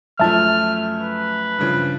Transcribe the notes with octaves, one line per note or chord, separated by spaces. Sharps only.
F#2 F3 A3 E5 A5 F6
B4
G2 C#3 F3